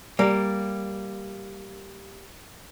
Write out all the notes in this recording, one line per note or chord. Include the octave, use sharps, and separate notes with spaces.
G3 A#3